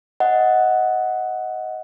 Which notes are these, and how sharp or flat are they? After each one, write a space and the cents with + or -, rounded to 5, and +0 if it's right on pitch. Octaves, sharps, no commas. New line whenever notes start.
D#5 +15 F#5 +0